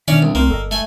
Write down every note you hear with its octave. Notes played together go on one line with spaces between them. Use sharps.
B2 D#3 C#4 D4 C#5 D5 E5
C2
C2 A3 A#3 C4 C6
G1 A4 D#5
A3 G#5